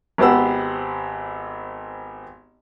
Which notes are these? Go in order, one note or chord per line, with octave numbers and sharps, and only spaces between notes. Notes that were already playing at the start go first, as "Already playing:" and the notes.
G#1 B3 G4 C5 F#5 E6